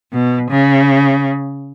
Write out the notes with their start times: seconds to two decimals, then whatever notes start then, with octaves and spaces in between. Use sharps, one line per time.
0.13 B2
0.50 C#3